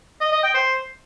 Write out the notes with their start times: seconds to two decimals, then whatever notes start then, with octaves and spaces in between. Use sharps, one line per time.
0.20 D#5
0.32 D#5
0.43 G5
0.54 C5